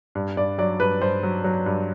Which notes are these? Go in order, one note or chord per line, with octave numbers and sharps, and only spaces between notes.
G2
G2 D5
F#3 D5
G2 B4
G2 C5
F#3
F#3
G2